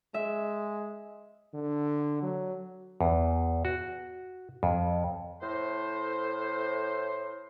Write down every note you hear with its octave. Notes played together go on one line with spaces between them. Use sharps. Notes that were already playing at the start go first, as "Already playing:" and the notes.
G#3 E5
D3
F#3
E2
F#4
F2
A2 C5